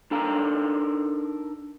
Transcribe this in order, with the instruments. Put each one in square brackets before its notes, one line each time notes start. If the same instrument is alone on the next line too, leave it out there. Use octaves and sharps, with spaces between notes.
[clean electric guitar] D4 D#4 A4 A#4 F5 A#5